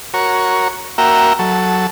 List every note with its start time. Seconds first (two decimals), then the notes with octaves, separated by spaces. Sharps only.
0.14 F#4 A#4 C#5
0.98 A#3 F#4 A#4 E5 G5
1.39 F#3 A4